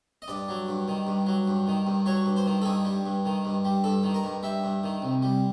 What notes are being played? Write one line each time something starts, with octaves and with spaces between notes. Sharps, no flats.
D#5
G2 D5
F#3
G2
D#3
G2
F#3
G2
D#3
G2
F#3 C#5
G2
C5
D#3
A4
G2 G#4
G3
G2
D#3
G2
G3
G2 A4
D#3
A#4
G2
G3 E5
G2
D#3
C2
G3